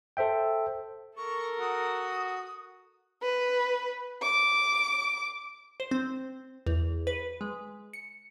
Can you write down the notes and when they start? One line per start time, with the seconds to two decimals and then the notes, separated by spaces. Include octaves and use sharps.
0.17 A4 C5 E5 G5
1.16 A4 A#4 C#6
1.60 F#4 D#6
3.23 B4
4.22 D6
5.80 C5
5.91 C4
6.67 E2
7.07 B4
7.41 G#3
7.93 C#7